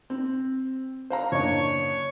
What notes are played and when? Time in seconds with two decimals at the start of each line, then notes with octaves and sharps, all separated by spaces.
0.10 C4
1.10 C5 F5 A#5
1.32 F#1 D4 C#5 D#5